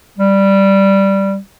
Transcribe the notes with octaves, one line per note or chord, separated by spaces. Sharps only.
G3